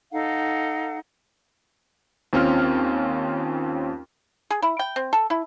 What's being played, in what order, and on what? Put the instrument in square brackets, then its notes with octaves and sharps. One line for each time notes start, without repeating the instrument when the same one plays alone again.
[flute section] D#4 A4 F5 F#5
[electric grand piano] D#2 C4 C#4 F4 F6
[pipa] G#4
E4
G5
C4
A4
E4